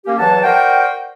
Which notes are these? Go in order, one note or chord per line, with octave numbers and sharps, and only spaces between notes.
A#3 C#4 G4
E2 E3 F#3 F#5 A5
F#4 A#4 C5 D5 G5